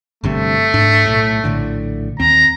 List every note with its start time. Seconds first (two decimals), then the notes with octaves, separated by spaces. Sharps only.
0.24 G1 G2 C3 A3
0.74 G#2 D4
1.06 B1 A2
1.44 A#1 A2 D3
2.20 D#2 C4 A#5